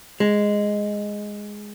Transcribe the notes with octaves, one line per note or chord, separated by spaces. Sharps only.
G#3